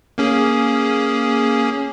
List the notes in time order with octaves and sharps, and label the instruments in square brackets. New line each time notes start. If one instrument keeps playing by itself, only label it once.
[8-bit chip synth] A#3 C#4 G#4